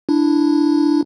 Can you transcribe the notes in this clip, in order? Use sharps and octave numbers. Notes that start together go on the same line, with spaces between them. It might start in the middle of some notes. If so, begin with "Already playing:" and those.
D4 E4